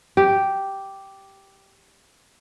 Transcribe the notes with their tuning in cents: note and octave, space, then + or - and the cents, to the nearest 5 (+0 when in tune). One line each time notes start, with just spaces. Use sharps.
G4 -5